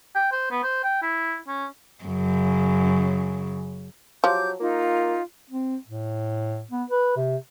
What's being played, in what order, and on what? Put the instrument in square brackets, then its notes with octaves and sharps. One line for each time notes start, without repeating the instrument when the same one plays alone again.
[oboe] G5
C5
B3
C5
G5
E4
C#4
[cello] F#2 C#3
[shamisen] F3 [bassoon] F#3 [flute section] G4 D6 G6
[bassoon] A#3 [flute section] D#4 [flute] F4
[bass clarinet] C4
A2
B3
B4
C3